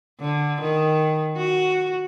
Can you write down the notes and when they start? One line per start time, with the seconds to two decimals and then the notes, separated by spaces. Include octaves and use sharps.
0.20 D3
0.61 D#3
1.37 F#4